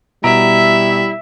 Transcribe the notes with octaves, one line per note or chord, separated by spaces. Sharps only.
B2 G3 E4 E5 A#5 D7